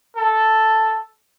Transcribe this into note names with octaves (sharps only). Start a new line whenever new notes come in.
A4